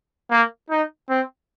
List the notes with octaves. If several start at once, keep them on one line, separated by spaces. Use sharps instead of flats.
A#3
D#4
C4